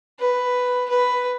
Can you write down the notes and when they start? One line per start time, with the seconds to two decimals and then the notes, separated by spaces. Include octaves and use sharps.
0.20 B4
0.90 B4